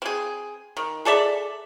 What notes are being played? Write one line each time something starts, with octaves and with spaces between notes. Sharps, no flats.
C4 G#4
D#3
G#4 A4 D5 E5